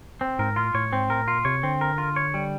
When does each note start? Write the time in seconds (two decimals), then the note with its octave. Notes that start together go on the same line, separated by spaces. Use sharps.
0.21 C4
0.39 G#2 A#4
0.56 A2 F4
0.74 A2 C#5
0.92 G#2 C4
1.10 A2 A#4
1.28 A#2 F4
1.45 C3 C#5
1.63 D3 C4
1.81 A#4
1.98 F4
2.16 C#5
2.34 G3